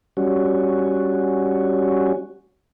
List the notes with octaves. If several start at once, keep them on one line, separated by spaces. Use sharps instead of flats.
G3 C#4 F#4